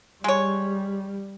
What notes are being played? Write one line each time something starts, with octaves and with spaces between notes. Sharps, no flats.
G3 G#3 C#5